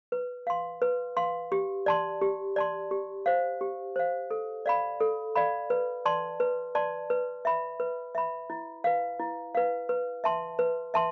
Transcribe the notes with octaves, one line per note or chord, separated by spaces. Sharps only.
B4
F5 C6
B4
F5 C6
G4
D5 A5 C6
G4
D5 A5 C6
G4
C5 F5
G4
C5 F5
A4
D5 F5 B5
A4
D5 F5 B5
B4
D5 A5 C6
B4
D5 A5 C6
B4
E5 B5
B4
E5 B5
E4
B4 F5
E4
B4 F5
B4
E5 A5 C6
B4
E5 A5 C6